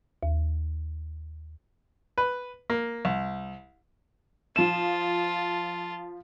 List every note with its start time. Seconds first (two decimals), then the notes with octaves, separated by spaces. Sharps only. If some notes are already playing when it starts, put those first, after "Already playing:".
0.23 D#2
2.18 B4
2.70 A#3
3.05 C2
4.56 F3 F4 A5 E7